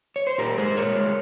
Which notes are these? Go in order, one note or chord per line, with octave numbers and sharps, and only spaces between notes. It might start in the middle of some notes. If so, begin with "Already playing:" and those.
C#5
C5
A#2 G4 A#4
G#3 G#4 C5
A#2 A#4 C#5
G#3